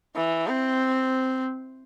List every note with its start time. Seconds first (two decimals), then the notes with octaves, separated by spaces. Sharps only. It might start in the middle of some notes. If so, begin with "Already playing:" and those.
0.16 E3
0.48 C4